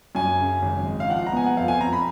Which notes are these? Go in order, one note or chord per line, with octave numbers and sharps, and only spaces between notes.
F#2 G#5
C#3
G#1
G#3
F5
F3 F#5
A#5
B3 G#5
F#5
F2 F5
G#5
F2 A#5
B5